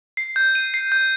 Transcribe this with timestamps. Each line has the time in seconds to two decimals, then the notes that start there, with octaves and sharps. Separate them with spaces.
0.17 C7
0.36 G6
0.55 D#7
0.74 C7
0.92 G6